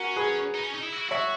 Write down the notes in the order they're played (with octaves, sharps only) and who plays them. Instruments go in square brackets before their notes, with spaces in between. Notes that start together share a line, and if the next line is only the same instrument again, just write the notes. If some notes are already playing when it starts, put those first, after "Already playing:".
Already playing: [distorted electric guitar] C#4 [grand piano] F#4 A#4
[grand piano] G#4 B4
[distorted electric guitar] D#4
C#4
D#4
E4
F#4
E4
[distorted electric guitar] F#4 [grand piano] C#5 E5